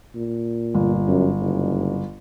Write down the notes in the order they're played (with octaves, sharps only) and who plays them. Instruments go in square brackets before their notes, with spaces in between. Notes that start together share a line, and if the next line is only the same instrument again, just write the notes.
[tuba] A#2
[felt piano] G1
[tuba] F#2
F#1